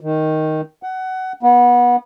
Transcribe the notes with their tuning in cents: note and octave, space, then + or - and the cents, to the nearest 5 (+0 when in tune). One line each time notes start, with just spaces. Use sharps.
D#3 +5
F#5 +20
B3 -25